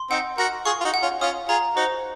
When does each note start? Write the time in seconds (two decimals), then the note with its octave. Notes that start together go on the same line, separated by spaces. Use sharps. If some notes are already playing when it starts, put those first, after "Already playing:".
Already playing: C6
0.10 C4 D#4 F#5
0.38 F#4 A#4 F#5
0.65 F4 G#4 C#6
0.81 F4
0.85 D#4 F#4
0.94 F#5
1.02 C#4 F4
1.21 C#4 F4 D#6
1.48 F4 G#4 A#5
1.76 D#4 F#4 C5